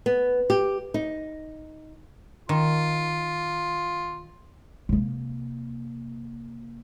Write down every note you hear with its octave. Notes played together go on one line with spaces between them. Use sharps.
B3
G4
D#4
D#3 F4
C3 A#3